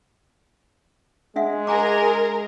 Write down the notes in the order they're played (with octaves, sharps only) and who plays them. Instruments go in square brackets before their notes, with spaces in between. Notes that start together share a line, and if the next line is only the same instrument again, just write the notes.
[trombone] G#3 [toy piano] D4 E5 F#5
[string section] G#4 A#4 [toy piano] G#5 A#5 D6